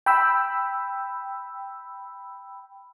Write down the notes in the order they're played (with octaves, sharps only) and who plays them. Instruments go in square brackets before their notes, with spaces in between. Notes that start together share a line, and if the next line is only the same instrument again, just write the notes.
[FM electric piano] G5 B5 E6